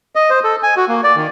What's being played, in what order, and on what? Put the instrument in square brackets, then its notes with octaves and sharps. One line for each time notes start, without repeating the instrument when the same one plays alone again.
[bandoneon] D#5
C5
A4
G#5
F#4
A#3
D5
D#3